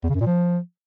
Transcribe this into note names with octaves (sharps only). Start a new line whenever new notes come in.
E2
C#3
F#2
A#2
F3